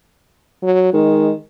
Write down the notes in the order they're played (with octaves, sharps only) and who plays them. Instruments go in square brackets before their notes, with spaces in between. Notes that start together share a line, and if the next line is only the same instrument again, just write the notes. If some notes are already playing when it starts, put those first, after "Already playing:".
[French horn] F#3
[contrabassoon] D#3 [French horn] G#3